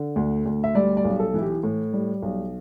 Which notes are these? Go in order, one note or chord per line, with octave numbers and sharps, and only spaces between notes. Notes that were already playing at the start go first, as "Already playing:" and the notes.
Already playing: D3
D2
D2
E5
G3 D5
D5
B1
A4
E3 E4
G4
A2
G3
B1